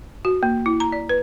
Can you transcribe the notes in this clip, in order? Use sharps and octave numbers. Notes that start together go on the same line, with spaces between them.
F#4
A#3
E4
A#5
D5
B4